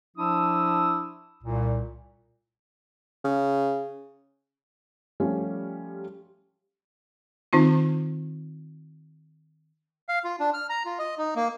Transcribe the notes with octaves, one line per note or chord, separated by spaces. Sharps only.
F3 D4 E4 D#6 E6
C2 A#2
C#3
F3 G3 A3 C#4
D#3 C4 D#4 F4
F5
F4
D4
F6
A#5
F4
D#5
D#4
A#3